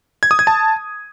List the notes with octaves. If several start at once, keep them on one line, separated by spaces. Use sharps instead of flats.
G#6
D#6
G#6
A5